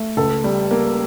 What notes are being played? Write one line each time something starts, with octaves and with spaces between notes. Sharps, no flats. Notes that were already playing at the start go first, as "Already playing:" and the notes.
Already playing: A3
C#2 A4
G3
A#3